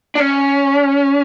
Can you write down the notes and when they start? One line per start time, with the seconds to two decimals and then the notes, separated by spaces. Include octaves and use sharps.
0.15 D4
0.20 C#4